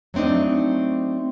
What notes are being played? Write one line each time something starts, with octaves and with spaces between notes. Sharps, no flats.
F#3 A3 C4 D4 D#4